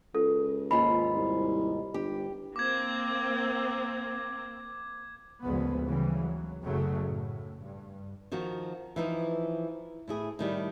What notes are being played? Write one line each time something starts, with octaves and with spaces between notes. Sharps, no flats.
C#2 A4
D#2 G#2 F4 B5
C2
G1 G4
A#3 C4 D6 G#6
G#1 D2 C#3 F3 B3
C#3 E3 G3
F#3
F#1 F#2 C#3 F#3 A3
A2
G2
D#3 F3 F#4 A#4
E3 F3 D#4
A2 E4 G#4
A2 D#3 G3